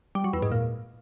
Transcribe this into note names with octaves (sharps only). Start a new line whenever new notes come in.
G3
F#3
E2
G#2
A#2